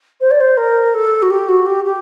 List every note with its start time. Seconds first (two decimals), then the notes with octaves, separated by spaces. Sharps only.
0.21 C5
0.31 D5
0.40 C5
0.57 A#4
0.94 A4
1.22 F#4
1.30 G4
1.48 F#4
1.66 G4
1.84 G4